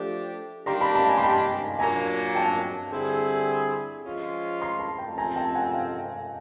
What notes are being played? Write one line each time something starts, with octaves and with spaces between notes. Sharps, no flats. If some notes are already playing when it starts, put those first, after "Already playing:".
Already playing: F3 A3 D4 G4
D#3 G3 A#3 D4 G4 A#5 C6
A5 B5
A5 B5
G#5 A#5
C6
A5 B5
A#2 F#3 A#3 D4 G#5 A#5
G5 A5
D3 G3 C4 E4 G#4
F3 G#3 C#4 F4
A#5 C6
A5 B5
G5 A5
A5
C3 F3 A3 C4 G#5 A#5
G5 A5
F#5 G#5
F5 G5